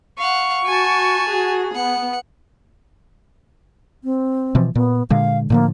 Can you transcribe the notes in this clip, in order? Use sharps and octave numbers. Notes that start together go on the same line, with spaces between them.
F5 F#5 C#6
F#4 G#5 A5
G#4
B3 F#5
C4
B2 E3 F3
A#2 B3
A#2 D3 G#3 F5
A2 D3 F3 A#3